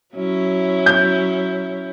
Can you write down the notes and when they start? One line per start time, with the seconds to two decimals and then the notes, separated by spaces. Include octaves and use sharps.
0.14 F#3 C#4 E4
0.86 G6